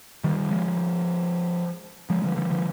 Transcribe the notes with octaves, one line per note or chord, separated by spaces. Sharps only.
D#3 G3
F3 G#3
F3 G#3
D3 F3
D3 F3
D3 F3